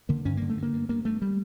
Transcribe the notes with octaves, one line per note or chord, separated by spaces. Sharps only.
D3 A#3
G2 C#4
D3 A#3
A3
G2
A#3
G2
G2 A#3
G2 A3
G3